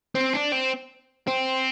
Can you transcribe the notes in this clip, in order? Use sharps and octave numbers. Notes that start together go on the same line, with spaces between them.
C4
D4
C4
C4